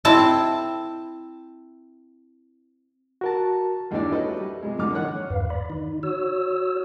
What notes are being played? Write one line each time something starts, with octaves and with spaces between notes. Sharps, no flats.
C4 E4 A5
F#4 A#4 A5
A1 D#2 G#3 D4 C#5 D5
E4 F#4 G4 A4 B4 D#5
G3
C3 F3 G#3
A#1 G#2 D3 D6 F6
D3 D#3 C#5 F#5 F#6
E2 G2 B4 F5
D5 B5
D#3 D#4
F#4 C#5 E6